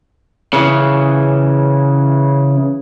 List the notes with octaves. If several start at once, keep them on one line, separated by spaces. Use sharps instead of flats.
C#3 E3